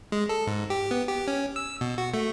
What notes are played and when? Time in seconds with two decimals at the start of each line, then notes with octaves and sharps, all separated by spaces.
0.12 G#3
0.29 A4
0.47 G#2
0.70 G4
0.91 B3
1.08 G4
1.27 C#4
1.56 E6
1.81 B2
1.98 F#4
2.14 A3